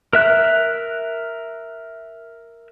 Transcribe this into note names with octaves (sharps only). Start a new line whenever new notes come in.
A#4 E5 F#6